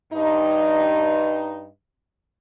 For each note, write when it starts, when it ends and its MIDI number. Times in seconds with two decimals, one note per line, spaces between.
0.13 1.68 43
0.13 1.68 63